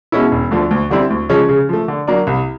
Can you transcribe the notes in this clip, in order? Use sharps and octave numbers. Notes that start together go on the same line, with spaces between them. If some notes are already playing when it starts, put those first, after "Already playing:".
B2 G#3 C#4 E4
E1
D2 D3 F3
D2
D3 G3 C4 E4
D2
C#3 F3 G#3 C#4
C#3
F3 A3
D3
F#3 A#3 D4
C2